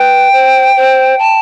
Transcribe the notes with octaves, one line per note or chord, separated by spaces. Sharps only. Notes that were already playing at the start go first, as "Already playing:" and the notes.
Already playing: B4 G5
C5
C5
A5